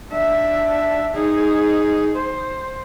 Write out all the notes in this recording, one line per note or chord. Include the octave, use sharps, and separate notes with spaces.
D4 E5
D#4 G#4
C5